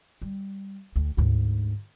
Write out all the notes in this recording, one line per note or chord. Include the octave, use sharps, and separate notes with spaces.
G3
D2
D2 G#2